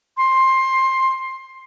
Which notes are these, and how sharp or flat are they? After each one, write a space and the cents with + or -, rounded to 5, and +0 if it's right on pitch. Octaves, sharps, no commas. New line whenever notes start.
C6 +15